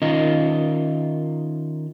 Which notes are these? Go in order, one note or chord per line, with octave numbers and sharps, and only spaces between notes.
D#3 C#4 D#4 F4 A#4 D#5